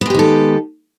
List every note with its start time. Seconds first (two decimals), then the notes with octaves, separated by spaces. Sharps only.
0.01 B3
0.06 G#3
0.10 G4
0.15 D#3
0.19 A4